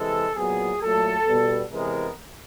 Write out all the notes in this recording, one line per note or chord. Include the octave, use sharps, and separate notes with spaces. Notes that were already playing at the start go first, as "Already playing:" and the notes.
Already playing: C3 E3 G#3 A4
A#2 F#3 B3 G#4
A#2 F#3 A3 A4
B2 G3 B3
C3 E3 G#3 B3 A#4